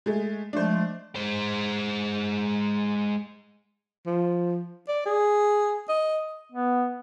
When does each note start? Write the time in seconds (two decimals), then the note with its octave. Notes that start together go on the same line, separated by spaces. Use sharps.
0.06 G#3 A3
0.53 F3 G#3 A3 D4 C5
1.16 G#3 C5
4.06 F3
4.88 D5
5.06 G#4
5.89 D#5
6.52 B3